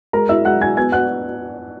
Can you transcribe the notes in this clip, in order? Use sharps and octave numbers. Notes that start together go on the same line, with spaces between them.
G#3 A#4 A#5
E4 E5 E6
G#3 F#5 F#6
E4 G#5 G#6
B3 G#5 G#6
B3 F#5 F#6